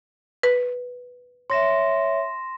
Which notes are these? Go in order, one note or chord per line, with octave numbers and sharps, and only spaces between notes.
B4
C#5 E5 C6 A#6 E7